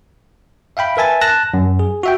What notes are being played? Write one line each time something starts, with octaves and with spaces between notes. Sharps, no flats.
E5 F5 G5 B5
A#4 B4 E5 G#5 A5 A6
A5 F#6 A#6
F#2
G#4
F#4 E5 G5